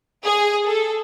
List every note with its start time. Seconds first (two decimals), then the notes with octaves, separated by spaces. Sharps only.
0.24 G#4
0.65 A4